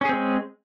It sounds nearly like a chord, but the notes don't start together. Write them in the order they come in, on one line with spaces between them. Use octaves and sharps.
C#4 G#4 C4 G#3